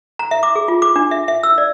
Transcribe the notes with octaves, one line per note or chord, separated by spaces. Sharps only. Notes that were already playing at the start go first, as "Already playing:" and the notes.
A#5
E5
D6
G#4
F4
D6
D4
E5
E5
E6
D5